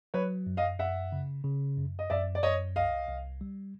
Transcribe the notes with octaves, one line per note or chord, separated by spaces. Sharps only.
F#3 B4 C#5
F#2
D#5 F5
F#2 E5 F#5
C#3
C#3
F#2
D#5
F#2 D5 E5
D5
F#2 C#5 D#5
C2 D#5 F5
C2
G3